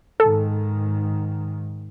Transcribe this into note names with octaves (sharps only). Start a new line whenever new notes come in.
G#2 D#3 A4